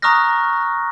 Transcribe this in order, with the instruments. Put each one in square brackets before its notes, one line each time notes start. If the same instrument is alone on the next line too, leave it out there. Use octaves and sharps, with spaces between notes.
[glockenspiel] A#5 C#6 D#6 F6 F#6 A#6